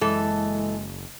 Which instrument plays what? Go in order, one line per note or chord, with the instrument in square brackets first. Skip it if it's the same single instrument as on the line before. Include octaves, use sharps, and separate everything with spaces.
[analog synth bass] F#1 [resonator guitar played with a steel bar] E3 A4 [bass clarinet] G#3